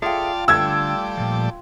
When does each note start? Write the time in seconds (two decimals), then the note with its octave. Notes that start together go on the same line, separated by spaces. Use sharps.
0.02 F4 G#4 A4 D5 E5 F5 G5 A5
0.48 D3 G3 A3 D5 E6 G#6
1.18 A#2 F3